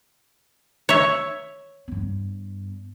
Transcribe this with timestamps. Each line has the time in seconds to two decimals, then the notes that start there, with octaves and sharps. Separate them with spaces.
0.89 C#5 E5
1.88 G2 B3